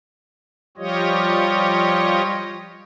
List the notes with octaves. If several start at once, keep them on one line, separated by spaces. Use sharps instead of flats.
F3 G3 F4 G4 C#5 D#5